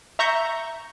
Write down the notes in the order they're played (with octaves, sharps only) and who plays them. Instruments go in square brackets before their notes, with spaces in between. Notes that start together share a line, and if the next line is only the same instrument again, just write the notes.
[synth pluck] E5 A#5 C#6 G6 A#6